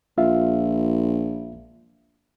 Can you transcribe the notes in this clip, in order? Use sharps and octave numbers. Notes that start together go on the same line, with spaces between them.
A#1 F4 E5 F5